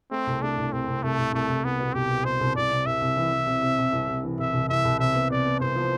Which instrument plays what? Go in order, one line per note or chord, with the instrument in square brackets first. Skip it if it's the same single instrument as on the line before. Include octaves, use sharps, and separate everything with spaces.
[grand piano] A3 [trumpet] C4
[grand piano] C2
[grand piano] A3 [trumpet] D4
[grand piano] C2
[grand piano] C2 [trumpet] C4
[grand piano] C2
[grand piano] C2 [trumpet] A3
[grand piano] C2
[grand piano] C2 [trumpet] A3
[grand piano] C2
[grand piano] C2 [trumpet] B3
[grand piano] B2
[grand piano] C2 [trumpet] G4
[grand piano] C2
[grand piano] B2 [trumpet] C5
[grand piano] C2
[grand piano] C2 [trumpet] D5
[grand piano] C3
[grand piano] C2 [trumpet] E5
[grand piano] C2
E3
E3
C3
C3
C3
C2
C3
E3
[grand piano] C2 [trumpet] E5
[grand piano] C2
[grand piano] C2 [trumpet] E5
[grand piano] C2
[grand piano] C3 [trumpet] E5
[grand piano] B3
[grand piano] C3 [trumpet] D5
[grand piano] B3
[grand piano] C2 [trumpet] C5
[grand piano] F3